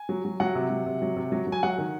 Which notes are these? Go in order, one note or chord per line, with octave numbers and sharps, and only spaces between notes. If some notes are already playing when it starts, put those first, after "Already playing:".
Already playing: G#5
F#3
F#3
F#3 F#5
C3
F#3
C3
F#3
C3
F#3
F#3
G#5
F#3 F#5
D#3